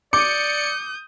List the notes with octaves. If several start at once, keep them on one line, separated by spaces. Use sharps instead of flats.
D5 D6 D#6 G6 C#7